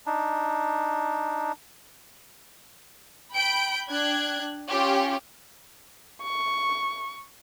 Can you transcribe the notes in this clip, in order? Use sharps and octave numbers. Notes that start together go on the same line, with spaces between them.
D4 D#4
G5 B5 G6 D7
D4 G5 F#6 G#6
C#4 F4 G4
C#6